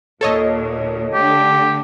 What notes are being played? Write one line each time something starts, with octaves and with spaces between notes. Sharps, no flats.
D#2 A#2 A4 C#5 D#5
D3 A3 D4 G4